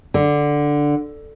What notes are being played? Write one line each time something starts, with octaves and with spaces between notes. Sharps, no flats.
D3